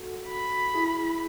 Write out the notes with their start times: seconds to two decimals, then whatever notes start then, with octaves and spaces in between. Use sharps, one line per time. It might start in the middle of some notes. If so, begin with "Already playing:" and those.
Already playing: F#4 A4
0.28 B5
0.74 E4 G#4